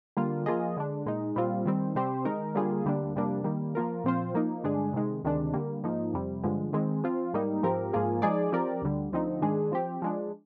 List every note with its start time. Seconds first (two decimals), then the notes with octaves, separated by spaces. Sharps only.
0.17 D3 G3 A#3 F4
0.46 F3 A#3 F4 G#4 D#5
0.77 D3 G#3 D4
1.06 A#2 G#3 D#4
1.36 A#2 G3 C4 F4
1.65 D#3 G3 C4
1.95 C3 G3 C4 G4 C5
2.25 D#3 G#3 D#4 A#4
2.55 D3 G3 A#3 F4 G#4
2.85 D2 D3 G3 A#3 D4
3.15 F2 C3 G3 A#3 D4
3.44 D#3 G3 A#3
3.75 F3 A#3 F4 A#4
4.04 A#2 F3 C4 F4 C5
4.34 F3 A#3 D#4
4.64 G2 D3 G#3 D4 G#4
4.94 C3 D#3 G#3
5.23 D2 C3 D#3 G#3 D4
5.54 D3 G3 A#3
5.84 G#2 F3 A#3 D#4
6.14 F2 C3 G3
6.43 G2 D3 F3 G#3
6.73 D#3 G#3 C4
7.04 F3 C4 F4
7.34 G#2 G3 A#3 D#4
7.63 G#2 F3 C4 G4 A#4
7.93 G#2 F3 A#3 F4 G#4
8.22 F3 G#3 D#4 G#4 D5
8.52 F3 C4 G4 A#4 D5
8.82 D2 D3 G3
9.12 D2 D3 F3 C4 D#4
9.42 G#2 D#3 G#3 D4 G#4
9.72 F3 C4 G4
10.02 F3 G#3 D4